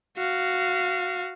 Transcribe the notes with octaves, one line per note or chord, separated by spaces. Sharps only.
F#4 F5